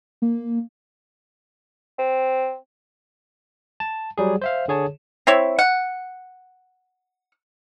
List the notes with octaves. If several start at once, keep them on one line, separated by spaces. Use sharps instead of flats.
A#3
C4
A5
F#3 G3 G#4
C5 E5 F5
D3 G#4 C#5 A5
C4 E4 C#5
F#5